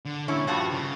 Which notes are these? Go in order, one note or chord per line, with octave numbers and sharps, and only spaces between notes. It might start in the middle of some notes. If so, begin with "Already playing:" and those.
D3
A#2 D3 C#4 E4
G2 F3 G3 F#4
C#3